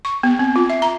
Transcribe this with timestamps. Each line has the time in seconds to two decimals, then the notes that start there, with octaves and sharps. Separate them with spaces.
0.05 C#6
0.23 B3
0.39 C4
0.56 F4
0.70 E5
0.82 A#5